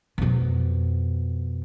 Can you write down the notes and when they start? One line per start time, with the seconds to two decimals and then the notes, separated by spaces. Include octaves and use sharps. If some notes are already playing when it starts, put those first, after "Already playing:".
0.18 F2 B2